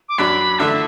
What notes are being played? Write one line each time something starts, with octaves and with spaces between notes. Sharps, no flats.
D6
F#2 F#3 D4 B5
D3 A3 D4 E5